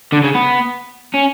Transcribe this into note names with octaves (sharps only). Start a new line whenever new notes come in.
D3
C#3
B3
C#4